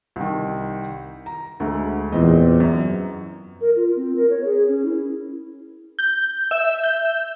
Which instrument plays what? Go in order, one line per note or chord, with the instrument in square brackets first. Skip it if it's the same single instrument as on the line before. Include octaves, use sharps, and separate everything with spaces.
[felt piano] C2 D#3
A#5
D2 G#3 A3
[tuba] E2 [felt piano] A#2 C4 D#5
[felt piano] F#2
[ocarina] A#4
F4
C4
A#4
C#5
G#4
C#4
E4
[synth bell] G6
E5
G6